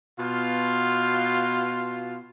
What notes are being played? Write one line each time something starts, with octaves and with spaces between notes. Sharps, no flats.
B2 F4